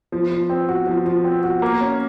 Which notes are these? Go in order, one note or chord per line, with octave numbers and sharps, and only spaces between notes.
F3
F3
C4
F#4
F3
F3
C4
F#4
A#3
C#4